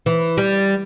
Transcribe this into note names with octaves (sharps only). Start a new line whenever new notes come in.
E3
G3